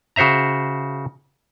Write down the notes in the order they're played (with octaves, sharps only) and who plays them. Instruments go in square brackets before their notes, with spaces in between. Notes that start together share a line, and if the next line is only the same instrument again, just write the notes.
[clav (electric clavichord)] C#3 F#4 C5 E5 A#5